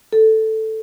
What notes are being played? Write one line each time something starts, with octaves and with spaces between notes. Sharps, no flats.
A4